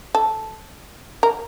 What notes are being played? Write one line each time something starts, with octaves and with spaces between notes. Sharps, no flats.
A4
A#4